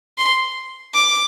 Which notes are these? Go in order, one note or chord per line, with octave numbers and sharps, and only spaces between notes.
C6
D6